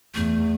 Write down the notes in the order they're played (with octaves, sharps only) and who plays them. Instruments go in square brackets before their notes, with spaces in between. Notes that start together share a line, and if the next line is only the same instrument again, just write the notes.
[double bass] E2 [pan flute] A3